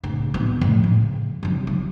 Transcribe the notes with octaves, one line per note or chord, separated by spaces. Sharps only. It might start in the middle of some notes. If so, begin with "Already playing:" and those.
D1 C#3
B2 C4
A2 F3
C#3
C3 F#3
F4